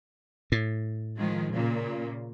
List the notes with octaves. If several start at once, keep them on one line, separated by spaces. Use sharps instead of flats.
A2
D#3 F3 G#3
A#2 C#3 A#3